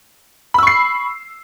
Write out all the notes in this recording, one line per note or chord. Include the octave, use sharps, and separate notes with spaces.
B5 C#6 E6 C7